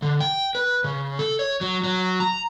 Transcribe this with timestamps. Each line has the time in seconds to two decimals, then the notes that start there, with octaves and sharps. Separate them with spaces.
0.02 D3
0.20 G5
0.55 B4
0.84 C#3
1.19 A4
1.39 C#5
1.61 F#3
1.84 F#3
2.20 A#5